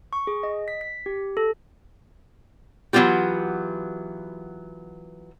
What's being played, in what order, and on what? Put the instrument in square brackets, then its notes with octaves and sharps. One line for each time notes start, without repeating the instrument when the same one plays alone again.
[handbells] C#6
G#4
D#5
B6
B6
G4
A4
[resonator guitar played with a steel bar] E3 F#3 A#3 B3 F4 G4